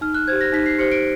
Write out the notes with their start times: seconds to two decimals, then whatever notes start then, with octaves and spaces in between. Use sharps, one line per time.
0.01 D#4 F6
0.14 F#6
0.28 G4 C5 G#6
0.41 A#6
0.53 D#4 B6
0.66 C7
0.78 G4 C5 C#7
0.92 D7